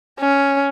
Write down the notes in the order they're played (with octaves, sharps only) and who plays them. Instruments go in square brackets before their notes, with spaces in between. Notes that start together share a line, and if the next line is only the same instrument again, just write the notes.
[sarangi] C#4